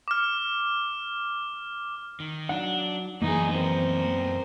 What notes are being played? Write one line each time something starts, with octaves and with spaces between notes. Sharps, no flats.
D6 F6
D#3
F#3 D4 D#4 F#5
F#2 E3 A#3 B3 D#4 G#4
C4 A#4